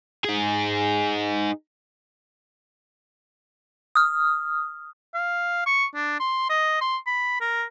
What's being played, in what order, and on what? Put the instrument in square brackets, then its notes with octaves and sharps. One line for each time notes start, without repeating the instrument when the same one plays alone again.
[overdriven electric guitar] D#4 G#4
[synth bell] D#6 F6
[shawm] F5
C#6
D4
C6
D#5
C6
B5
A#4